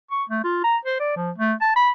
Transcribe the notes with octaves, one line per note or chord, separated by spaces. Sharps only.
C#6
A3
F4
A#5
C5
D5
F3
A3
A5
B5